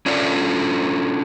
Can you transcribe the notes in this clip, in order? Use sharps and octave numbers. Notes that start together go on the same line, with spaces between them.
C#4 D4 F4 A4 D5